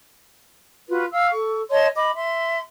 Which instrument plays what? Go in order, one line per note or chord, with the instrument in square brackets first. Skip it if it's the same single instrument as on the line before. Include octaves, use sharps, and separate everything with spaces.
[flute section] F4 F#4 B4
F5 E6
A4 C#6
C#5 D#5 A5 C6
D#5 B5 D6
E5 C6